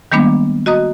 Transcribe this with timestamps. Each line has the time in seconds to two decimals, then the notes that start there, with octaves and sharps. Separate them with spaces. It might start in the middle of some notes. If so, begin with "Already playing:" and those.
0.12 D#3 G3 G#3 A#3 B3 D4
0.66 F#4 D#5 A#5 D#6